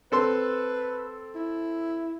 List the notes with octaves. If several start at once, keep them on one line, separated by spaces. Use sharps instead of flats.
C4 A4 B4 C6
E4